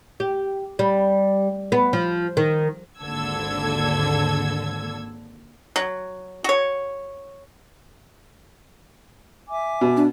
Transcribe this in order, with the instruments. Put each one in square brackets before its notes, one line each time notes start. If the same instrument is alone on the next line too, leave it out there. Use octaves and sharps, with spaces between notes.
[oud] G4
G3
B3
F3
D#3
[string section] G#1 D#2 D3 A4 E6 G#6
[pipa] F#3
F#4 C#5
[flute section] E5 G#5 D6
[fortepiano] B2
[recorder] D4